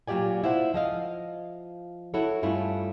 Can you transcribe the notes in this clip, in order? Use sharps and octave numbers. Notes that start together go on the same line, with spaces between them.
A#2 F#3 F4 G4 D5 G#5
E4 F4 C5 F#5
F3 D#5 F5
E4 F#4 A4 C#5
G2 A3 C#4 E4 F4